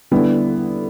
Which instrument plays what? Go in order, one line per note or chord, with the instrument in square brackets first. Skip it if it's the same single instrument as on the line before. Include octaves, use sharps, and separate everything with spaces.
[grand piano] D3 G3 B3 E4